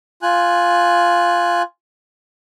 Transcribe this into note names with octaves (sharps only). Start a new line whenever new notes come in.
F4 G#5 F#6